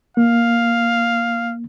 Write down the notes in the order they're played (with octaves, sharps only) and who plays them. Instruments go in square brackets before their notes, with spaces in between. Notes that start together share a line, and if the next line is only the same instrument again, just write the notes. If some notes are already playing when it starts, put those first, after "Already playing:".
[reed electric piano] A#3 [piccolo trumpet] F5